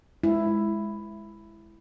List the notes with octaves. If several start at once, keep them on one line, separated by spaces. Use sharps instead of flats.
G#3 E4